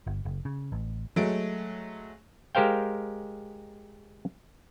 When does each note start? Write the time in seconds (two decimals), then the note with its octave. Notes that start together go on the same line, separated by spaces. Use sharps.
0.07 G1
0.25 F#1
0.45 C#3
0.72 A1
1.16 F#3 G#3 A3 D7
2.55 G#3 G4 A#4 C5 F5 G5